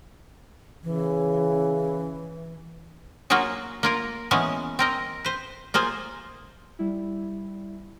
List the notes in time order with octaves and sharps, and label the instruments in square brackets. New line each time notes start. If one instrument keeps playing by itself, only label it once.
[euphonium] C#3 [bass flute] E3
[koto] F#3 A#3 F4 F#4 G#4
A#3 F4 A#4
E3 G#3 A#3 B3 C#4
C4 A#4 D#5
B4 C5
A#3 F4 G#4 C5
[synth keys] G3 E4